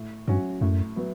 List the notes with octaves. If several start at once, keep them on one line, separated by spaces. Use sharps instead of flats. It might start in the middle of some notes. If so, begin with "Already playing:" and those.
Already playing: A2
G2 F#3 C#4 F#4
F#2 A2
F#3 B3